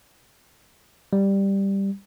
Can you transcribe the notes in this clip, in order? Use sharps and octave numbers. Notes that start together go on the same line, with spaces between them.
G3